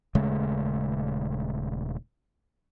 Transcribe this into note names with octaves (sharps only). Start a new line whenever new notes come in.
D#1 C#3 G#3 A3